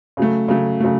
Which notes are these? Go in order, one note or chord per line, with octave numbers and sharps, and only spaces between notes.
C#3 F#3 A3
C#3 F#3 A3
C#3 F#3 A3